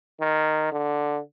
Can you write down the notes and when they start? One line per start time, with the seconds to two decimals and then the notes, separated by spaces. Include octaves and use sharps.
0.20 D#3
0.72 D3